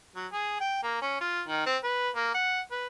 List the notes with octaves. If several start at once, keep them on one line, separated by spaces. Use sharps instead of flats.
F#3
G#4
G5
A#3
C#4
F4
D#3
C4
B4
A#3
F#5
B4